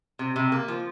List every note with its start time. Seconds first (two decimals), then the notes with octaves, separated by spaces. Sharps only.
0.19 C3
0.36 C3
0.52 A#3
0.68 F3